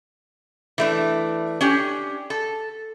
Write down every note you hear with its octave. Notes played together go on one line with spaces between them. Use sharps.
E3 A3 D4
C#4 D4 G4
A4